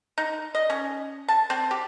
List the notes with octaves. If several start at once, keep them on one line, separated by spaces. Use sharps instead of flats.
D#4
D#5
C#4
A5
C4
G4